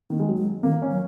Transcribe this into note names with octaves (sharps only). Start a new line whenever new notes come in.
D#3 A#3
G#3
F#3
G#3
D#3 A#3
C#4
F#3